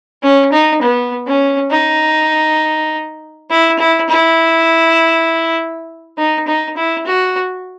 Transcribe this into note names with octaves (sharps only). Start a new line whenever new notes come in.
C#4
D#4
B3
C#4
D#4
E4
E4
E4
D#4
D#4
E4
F#4